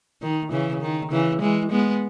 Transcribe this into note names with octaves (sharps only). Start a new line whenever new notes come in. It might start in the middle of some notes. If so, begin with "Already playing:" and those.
D#3
C#3 E3
D#3
C#3 E3
E3 G#3
G#3 B3